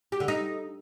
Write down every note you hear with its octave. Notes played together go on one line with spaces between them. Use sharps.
G4
D3
D#4